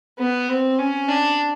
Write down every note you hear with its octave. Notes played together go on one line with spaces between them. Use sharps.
B3
C4
C#4
D4